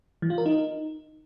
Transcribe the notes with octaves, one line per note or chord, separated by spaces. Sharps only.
E3
F4
A#4
D#4